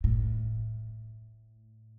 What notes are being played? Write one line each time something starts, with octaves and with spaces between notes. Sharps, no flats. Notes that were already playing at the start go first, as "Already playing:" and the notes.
A2